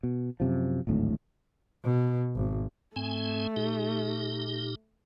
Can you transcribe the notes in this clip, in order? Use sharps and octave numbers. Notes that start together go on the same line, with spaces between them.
B2
F#2 C3 F3
D1 G#1 D2 A2
B2
G#1
G#2 A3 C4 G#5
A#2 D#4 G4